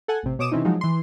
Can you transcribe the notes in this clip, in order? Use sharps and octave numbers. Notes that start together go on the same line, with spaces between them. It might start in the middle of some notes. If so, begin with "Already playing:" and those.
A4 F#5 G#5
A1 C3
B2 C#5 D6 D#6 E7
C3 E3 C4 C#4 D#4
F3 F#3 G#3 D#4
E3 C6